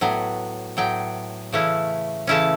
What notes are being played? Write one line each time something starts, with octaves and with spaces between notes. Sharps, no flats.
A2 F#3 B3
A2 F#3 B3 G5
C#3 E3 A3 C#4 E4
C#3 E3 A3 C#4 E4 A5